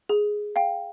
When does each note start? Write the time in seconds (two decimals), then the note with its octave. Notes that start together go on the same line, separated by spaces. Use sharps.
0.09 G#4
0.56 F5 G5